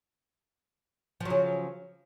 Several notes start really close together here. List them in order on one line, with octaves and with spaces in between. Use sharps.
F3 F#3 C#3